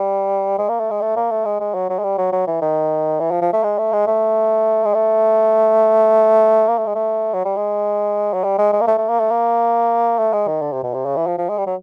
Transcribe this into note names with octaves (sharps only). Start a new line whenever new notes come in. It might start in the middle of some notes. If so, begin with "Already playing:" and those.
Already playing: G3
G#3
A#3
A3
G#3
A3
A#3
A3
G#3
G#3
F#3
F#3
G#3
G3
F#3
F#3
E3
D#3
E3
F3
F3
A3
G#3
A3
G#3
A3
G#3
A3
A#3
A3
G#3
A3
F#3
G3
G#3
F#3
G3
G#3
G#3
A#3
A3
A3
A#3
A3
A#3
A3
G#3
D#3
D3
C3
B2
C3
C#3
E3
F3
F3
G#3
G3
F#3